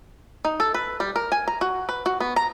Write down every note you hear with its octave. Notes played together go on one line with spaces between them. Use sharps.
D#4
A4
B4
G3
A#4
G#5
A#5
F#4
B4
F#4
B3
A#5